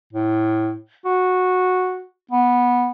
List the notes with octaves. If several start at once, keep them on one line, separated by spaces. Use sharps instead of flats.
A2
F#4
B3